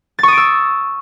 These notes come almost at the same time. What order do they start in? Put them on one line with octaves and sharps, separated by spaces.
A6 C#6 D#6 D7 E6